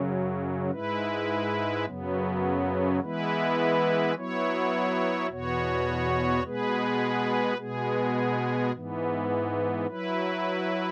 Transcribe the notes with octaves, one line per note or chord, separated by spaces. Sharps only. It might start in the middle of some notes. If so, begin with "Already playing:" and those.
Already playing: F#2 C#3 F#3
G#2 G#3 E4 B4
F#2 C#3 F#3 B3
E3 G#3 B3 E4 B4
F#3 B3 E4 C#5
E2 B2 B3 F#4 C#5
B2 G#3 B3 G#4 B4
B2 G#3 B3 G#4
G#2 E3 B3
F#3 E4 B4